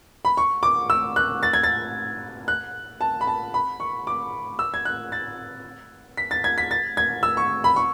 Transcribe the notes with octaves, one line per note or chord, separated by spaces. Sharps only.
B5
C#6
D6
E6
F#6
A6
G#6
A6
F#6
A5
B5
A5
B5
C#6
D6
E6
G#6
F#6
A6
B6
A6
G#6
B6
A6
G#6
E6
C#6
B5
C#6